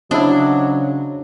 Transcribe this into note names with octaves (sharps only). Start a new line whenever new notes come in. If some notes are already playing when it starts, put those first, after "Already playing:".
C#3 F#3 D4 E4 C5 D#5